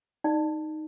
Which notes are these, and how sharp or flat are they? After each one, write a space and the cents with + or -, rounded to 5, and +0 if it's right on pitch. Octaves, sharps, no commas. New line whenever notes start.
D#4 +0 D5 +25